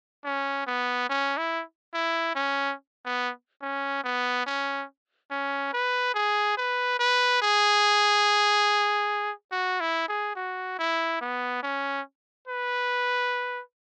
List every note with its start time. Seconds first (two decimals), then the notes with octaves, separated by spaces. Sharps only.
0.25 C#4
0.67 B3
1.09 C#4
1.37 E4
1.94 E4
2.35 C#4
3.06 B3
3.62 C#4
4.04 B3
4.46 C#4
5.31 C#4
5.73 B4
6.15 G#4
6.57 B4
7.00 B4
7.42 G#4
9.52 F#4
9.80 E4
10.08 G#4
10.36 F#4
10.79 E4
11.21 B3
11.63 C#4
12.48 B4